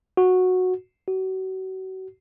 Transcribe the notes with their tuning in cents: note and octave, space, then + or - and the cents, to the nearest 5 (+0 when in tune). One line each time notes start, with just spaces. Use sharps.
F#4 -10
F#4 +35